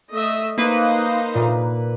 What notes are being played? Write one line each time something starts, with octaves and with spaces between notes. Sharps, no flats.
A3 D#5 E5
A#3 D#4 B4 C5 D#5
A#2